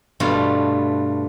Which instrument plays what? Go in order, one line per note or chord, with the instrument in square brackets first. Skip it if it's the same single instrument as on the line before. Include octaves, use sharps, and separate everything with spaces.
[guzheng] G2 B2 A3 F4